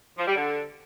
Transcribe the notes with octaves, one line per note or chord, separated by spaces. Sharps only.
F3
G3
D3